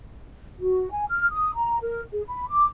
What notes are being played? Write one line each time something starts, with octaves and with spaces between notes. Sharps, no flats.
F#4
G#5
F6
D#6
A#5
A#4
G#4
B5
D6